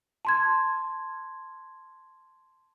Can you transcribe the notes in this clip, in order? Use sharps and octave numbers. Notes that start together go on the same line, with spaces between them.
A5 C6 G#6